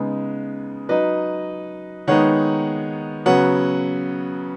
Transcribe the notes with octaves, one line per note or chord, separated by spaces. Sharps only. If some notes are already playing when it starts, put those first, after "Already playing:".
Already playing: C#3 G#3 B3 D#4
F#3 D#4 B4 D#5
D#3 G#3 B3 D#4 C#5 F#5
C#3 F#3 B3 C#5 F#5